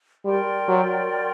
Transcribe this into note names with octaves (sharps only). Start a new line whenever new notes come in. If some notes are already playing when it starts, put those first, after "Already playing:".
G3 A#4 D5 G5 C6
F#3